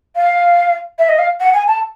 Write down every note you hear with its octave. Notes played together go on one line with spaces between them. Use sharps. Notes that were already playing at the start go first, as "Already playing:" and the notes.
F5
E5
D#5
F5
F#5
G#5
A5